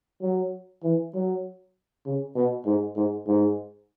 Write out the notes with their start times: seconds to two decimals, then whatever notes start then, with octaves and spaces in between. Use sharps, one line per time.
0.22 F#3
0.83 E3
1.14 F#3
2.05 C#3
2.36 B2
2.66 G#2
2.96 G#2
3.27 G#2